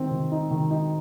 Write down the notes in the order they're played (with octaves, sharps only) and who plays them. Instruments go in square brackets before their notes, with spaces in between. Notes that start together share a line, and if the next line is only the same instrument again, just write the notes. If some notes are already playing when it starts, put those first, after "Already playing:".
Already playing: [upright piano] D#3 C4
D#3
D#4
D#3
D#4